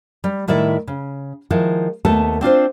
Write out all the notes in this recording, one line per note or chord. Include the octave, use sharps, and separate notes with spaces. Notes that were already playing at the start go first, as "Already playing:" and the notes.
G3
A2 D#3 E4 D5 E5
C#3
D#3 F3 G#3 E4
D#2 A3 B3 A4 A5
C4 D4 F4 C5